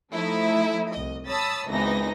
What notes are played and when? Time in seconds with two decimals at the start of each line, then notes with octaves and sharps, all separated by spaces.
0.12 F3 A3 D#4 E4
0.92 C2 D#5
1.27 C#5 A5 B5 D#6 E6 A6
1.69 G#1 C#2 E3 B3 D#4 A#6